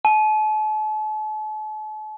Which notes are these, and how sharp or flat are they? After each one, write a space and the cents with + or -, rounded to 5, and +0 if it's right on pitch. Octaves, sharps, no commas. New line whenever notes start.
A5 -40